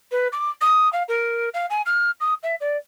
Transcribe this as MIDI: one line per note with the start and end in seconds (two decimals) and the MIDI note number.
0.12 0.28 71
0.32 0.50 86
0.61 0.91 87
0.93 1.03 77
1.08 1.49 70
1.54 1.66 77
1.70 1.82 80
1.86 2.11 89
2.20 2.34 87
2.43 2.55 76
2.61 2.77 74